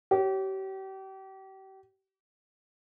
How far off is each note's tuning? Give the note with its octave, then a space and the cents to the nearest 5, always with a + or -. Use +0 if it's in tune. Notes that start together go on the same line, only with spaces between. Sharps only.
G4 -35 C#5 +0